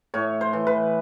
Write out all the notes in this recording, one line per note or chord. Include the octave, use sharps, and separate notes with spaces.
A2 C#5
C5
E3
B4